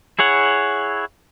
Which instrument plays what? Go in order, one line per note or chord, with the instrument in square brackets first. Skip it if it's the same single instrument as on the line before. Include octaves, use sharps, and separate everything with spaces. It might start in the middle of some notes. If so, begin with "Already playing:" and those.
[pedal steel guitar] E4 G#4 C#5 F#5